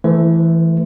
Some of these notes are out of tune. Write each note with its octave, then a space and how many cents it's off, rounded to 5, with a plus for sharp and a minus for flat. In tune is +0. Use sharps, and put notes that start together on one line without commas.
E3 +0 A3 +0 C5 -35